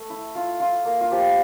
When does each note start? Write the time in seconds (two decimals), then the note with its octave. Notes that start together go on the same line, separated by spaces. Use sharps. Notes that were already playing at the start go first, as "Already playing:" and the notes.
Already playing: A3
0.10 E4
0.35 F4
0.60 F4
0.85 A#3
1.01 F4
1.11 F3 G4